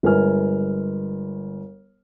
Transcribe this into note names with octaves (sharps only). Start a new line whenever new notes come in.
G1 G#3 A#4 B4 G#5 F6